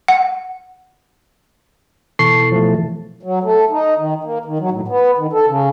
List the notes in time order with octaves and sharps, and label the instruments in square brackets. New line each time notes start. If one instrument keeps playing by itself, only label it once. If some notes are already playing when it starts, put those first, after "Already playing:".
[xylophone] F#5
[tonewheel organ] B2 E3 A4 [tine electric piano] A5 C#6 C7
[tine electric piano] F3 A3
[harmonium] F#3
A3
D#4
D#3
A#3
D#3
F#3
A2
B3
D#3
A4
C#3